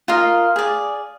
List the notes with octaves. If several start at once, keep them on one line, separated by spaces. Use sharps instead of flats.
F4 A#4 D#5 F5
G#4 D5